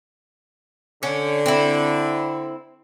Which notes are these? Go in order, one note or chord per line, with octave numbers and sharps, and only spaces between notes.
D3 C#4
C4 E4